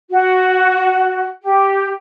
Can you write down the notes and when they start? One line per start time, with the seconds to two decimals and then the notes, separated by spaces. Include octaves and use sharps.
0.10 F#4
1.43 G4